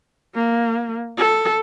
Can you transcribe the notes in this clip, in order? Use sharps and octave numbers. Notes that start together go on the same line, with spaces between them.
A#3
A4